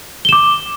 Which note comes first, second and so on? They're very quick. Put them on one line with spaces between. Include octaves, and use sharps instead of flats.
G7 E7 D6